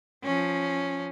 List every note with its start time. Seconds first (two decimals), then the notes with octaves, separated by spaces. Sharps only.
0.24 F3 C#4